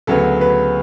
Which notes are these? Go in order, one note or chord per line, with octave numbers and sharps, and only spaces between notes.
D2 C#3 F#3 B3 A4
B4